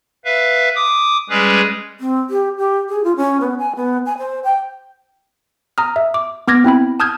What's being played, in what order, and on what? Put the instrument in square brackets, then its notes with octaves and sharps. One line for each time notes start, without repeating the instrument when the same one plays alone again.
[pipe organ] B4 E5 F5
D6 D#6
G3 G#3 C#4 G#4 B4
[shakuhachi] C4
G4
G4
G#4
F4
C#4
B3
G#5
B3
G#5
C5
G5
[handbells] A#5 D#6 F6
E5
D6
B3 D6 F6 G#6 A#6
C4 E4 G5 B5
A5 D#6 F6 G6 G#6